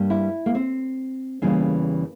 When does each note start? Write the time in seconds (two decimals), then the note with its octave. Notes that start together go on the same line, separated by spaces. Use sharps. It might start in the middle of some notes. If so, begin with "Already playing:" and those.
Already playing: G2 G3 A#3
0.10 E4
0.46 A#3
0.55 C4
1.42 E2 C#3 E3 G3 A#3